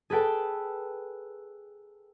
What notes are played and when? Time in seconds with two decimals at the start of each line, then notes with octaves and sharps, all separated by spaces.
0.10 G#4 A4 B4 G5 A5